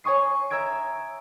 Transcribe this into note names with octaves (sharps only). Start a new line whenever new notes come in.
C#5 G#5 C#6 D#6 C7
E5 A#5 E6 G#6 D7